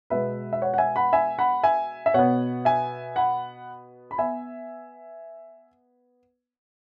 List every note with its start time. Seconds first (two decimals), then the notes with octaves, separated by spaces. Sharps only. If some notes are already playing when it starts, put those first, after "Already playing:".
0.10 B2 G#3 B3 B4 E5
0.53 E5
0.62 C#5 F#5
0.74 F#5
0.78 E5 G#5
0.96 F#5 B5
1.13 E5 G#5
1.39 F#5 B5
1.63 E5 G#5
2.06 E5
2.14 B2 B3 C#5 F#5
2.65 E5 G#5
3.16 F#5 B5
4.11 B5
4.18 B3 E5 G#5